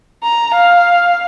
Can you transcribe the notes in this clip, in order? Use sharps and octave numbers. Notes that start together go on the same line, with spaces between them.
A#5
F5